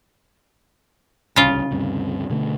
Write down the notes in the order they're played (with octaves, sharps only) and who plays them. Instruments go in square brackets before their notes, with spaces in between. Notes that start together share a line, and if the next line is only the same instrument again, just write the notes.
[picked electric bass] D1 C2 [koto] C#3 F4
[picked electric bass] D2 G2 C3
B2 D3 A3